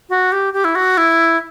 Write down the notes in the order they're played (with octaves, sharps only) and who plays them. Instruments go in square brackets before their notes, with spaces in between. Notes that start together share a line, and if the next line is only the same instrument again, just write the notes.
[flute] F#4
G4
G4
E4
F#4
E4